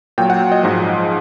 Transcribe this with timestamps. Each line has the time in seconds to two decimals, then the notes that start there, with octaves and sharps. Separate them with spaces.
0.18 A#2 F#3 G5
0.30 F#5
0.52 D#5
0.63 G#2 F3